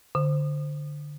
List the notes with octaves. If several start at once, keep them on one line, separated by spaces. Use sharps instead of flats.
D3